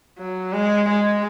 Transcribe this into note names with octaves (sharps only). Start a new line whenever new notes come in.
F#3
G#3
G#3